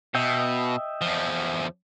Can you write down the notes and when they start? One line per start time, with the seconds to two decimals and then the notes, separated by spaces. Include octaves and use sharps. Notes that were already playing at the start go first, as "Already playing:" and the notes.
0.15 B2 D#5 E5 G5
1.01 E2 F3